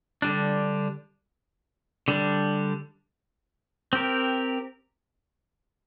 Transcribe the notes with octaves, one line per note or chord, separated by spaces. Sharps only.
D3 G3 D4
D3 G3 D4
C4 G4 A#4